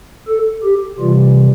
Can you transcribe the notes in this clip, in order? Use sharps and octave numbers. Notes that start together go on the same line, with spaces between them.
A4
G4
C3 E3 G3 F4